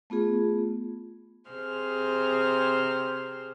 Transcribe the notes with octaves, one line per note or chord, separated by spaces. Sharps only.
A3 B3 F4 G#4
C3 G#4 C5 F6